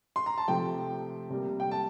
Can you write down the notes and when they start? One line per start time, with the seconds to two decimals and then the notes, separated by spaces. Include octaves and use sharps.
0.16 C6
0.26 A#5
0.38 A5
0.48 C3 F3 A3 G5
1.30 C3 G3 A#3
1.60 G5
1.71 A5